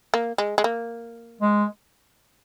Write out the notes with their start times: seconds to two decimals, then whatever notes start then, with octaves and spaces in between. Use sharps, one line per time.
0.14 A#3
0.38 G#3
0.58 G#3
0.64 A#3
1.41 G#3